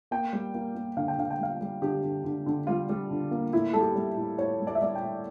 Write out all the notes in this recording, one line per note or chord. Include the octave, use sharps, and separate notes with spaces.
A#3 G5
G3
A#3
A#3
D3 F5
G5
D3 F5
G5
G3 F5
G3
D3 G4
D3
D3
D3
G3 F4
G3
D3
A#3
A2 E4
G3 A4
G4
G3
A2
A2 C#5
G3
D5
E5
G3 D5
G5
A2